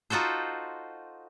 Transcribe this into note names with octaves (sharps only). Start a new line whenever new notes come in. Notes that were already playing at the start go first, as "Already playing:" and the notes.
D#4 F4 F#4 A4 C5